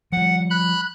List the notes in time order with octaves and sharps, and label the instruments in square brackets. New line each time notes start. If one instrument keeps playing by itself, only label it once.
[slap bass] F3 G3 [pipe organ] F#5
[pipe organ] B5 F#6